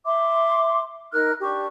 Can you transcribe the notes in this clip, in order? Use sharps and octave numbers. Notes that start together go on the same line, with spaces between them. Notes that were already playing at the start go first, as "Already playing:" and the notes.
E5 C6 D6
D#4 A#4 F6 F#6
D4 G4 C#6